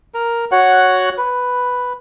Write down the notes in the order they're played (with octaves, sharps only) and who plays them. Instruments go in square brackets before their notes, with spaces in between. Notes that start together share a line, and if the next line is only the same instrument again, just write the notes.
[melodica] A#4
F#4 C#5 F#5
B4